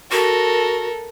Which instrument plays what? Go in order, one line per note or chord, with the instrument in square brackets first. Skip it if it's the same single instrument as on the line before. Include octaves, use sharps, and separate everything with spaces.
[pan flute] F#4 [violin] A4 A#4